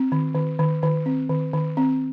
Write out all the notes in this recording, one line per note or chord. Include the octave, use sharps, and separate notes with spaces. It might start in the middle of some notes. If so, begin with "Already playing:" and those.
Already playing: C4
D#3
D#3
D#3
D#3
C4
D#3
D#3
C4